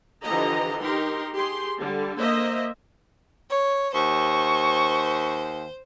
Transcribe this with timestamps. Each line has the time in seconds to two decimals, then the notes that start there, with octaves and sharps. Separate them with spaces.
0.22 D3 E3 F3 G4 D#5 A#5
0.81 D#4 G4 A#4 C6
1.33 G4 G#4 C6
1.79 D3 G3
2.18 A#3 C5 D#5 E5
3.50 C#5
3.94 D#2 C5 C#6